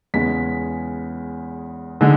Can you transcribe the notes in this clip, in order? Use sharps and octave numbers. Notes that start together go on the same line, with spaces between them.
E2 C#3 G#3 B6
D3 G#3